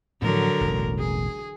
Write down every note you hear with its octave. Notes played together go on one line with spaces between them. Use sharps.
A2 D3 F3 F#3 A#4
E1 A1
G#4